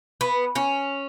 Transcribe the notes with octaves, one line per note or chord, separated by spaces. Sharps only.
B3
C#4